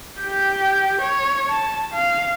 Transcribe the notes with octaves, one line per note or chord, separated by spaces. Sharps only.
G4 G5
C#5
A5
F5